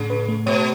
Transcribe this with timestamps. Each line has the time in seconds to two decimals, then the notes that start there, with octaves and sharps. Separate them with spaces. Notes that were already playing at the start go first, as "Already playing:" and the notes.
Already playing: A2 C#3
0.10 B4
0.29 A3
0.46 B2 C#5